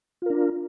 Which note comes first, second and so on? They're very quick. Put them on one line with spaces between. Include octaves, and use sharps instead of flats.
F4 A#4 D4